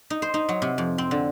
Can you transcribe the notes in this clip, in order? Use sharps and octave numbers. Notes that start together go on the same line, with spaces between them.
D#4
C5
D#4
F#3
C3
F2
C4
D3